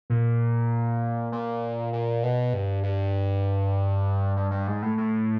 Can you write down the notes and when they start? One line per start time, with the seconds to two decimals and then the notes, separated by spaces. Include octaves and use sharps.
0.10 A#2
1.32 A#2
1.93 A#2
2.23 B2
2.53 G2
2.83 G2
4.36 G2
4.51 G2
4.67 G#2
4.82 A2
4.98 A2